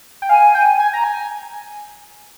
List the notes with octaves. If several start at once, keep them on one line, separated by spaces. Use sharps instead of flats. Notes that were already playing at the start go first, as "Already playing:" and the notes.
G5
F5 G#5
G5
G#5
A#5
G#5